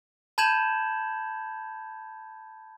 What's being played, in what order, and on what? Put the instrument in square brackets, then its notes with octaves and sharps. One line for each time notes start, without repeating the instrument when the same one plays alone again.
[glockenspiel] A5 B5 G6 G#6 E7 F#7